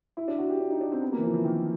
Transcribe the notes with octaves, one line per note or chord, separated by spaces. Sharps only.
E4
D4
F#4
G4
D4
D#4
D4
C4
B3
A#3
E3
F3
E3
D#3